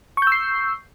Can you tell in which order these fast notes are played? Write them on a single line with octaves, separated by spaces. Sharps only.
C#6 G6 E6 C7